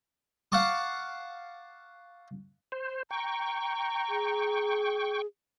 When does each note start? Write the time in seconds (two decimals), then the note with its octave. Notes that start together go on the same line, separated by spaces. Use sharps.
0.52 F5 F#5 A5 C#6 D6
2.72 C5
3.11 G5 A#5 C#6
4.09 G#4